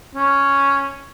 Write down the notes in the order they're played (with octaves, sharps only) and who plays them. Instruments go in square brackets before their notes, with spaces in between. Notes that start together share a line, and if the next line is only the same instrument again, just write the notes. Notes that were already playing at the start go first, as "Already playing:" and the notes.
[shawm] C#4